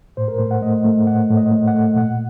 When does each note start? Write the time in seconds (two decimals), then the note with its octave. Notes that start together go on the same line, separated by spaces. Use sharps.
0.17 A2 C5
0.28 A#4
0.38 A2 C5
0.51 F#5
0.62 A3 D#5
0.85 A3
1.07 A2 F#5
1.30 A2
1.37 D#5
1.52 A3
1.68 F#5
1.74 A3
1.96 A#2 F#5